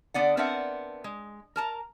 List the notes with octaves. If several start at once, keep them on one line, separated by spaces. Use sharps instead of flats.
D3 B3 D5 F#5
B3 C4 D4 A#4 E5 F#5
G#3
A#4 A5 A#5